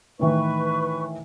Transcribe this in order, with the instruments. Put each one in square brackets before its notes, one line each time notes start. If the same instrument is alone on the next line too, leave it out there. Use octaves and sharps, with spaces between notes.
[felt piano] A2 D#3 E3 [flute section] B4 C#6